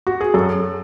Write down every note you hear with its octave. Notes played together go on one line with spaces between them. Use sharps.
F#4
G#4
F#2 A4